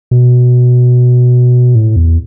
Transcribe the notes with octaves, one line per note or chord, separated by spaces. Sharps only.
B2
A2
E2